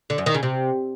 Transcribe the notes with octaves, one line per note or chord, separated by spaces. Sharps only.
D3
F#2
D#3
C#3
C3